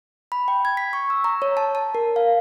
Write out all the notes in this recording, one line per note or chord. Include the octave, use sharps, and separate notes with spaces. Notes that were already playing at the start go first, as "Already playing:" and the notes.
B5
G5
G#6
B6
C#6
E6
A#5
C#5
A5
A5
A#4
F5